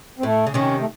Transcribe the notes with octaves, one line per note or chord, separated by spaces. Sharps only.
C4
A2 A3
C#3
C3 D#3 C#4
A3